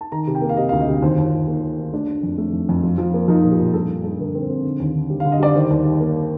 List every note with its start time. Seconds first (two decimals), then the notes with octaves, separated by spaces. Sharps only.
0.01 A5
0.12 D#3 A#5
0.27 C3
0.35 G5
0.42 A#3
0.49 F5
0.57 C3 D#5
0.69 D2 F5
0.81 D#5
0.88 C3
1.02 D#2 C5
1.18 D#2
1.25 F4
1.33 D#2
1.48 A#3 D#4
1.63 A#3
1.77 D#3
1.93 A3 D4
2.09 A3
2.23 F2
2.38 A3
2.53 F2
2.69 F2
2.84 F3
2.98 F3
3.14 A#3
3.28 F3 D#4
3.43 A#2
3.51 G4
3.59 A#2
3.74 G2 A4
3.89 G2
4.04 G2 A4
4.19 D3 A#4
4.34 C4 A#4
4.42 C5
4.50 C4
4.64 D3
4.80 D#2
4.94 D3
5.10 G3
5.20 D3 F5
5.32 D#5
5.39 G3 D5
5.55 D#3 C5
5.70 D#2
5.85 D#3
6.00 A#3